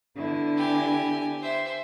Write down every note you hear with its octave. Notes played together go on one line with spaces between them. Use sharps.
D3 B3 E4
G4 G#5
C5 E5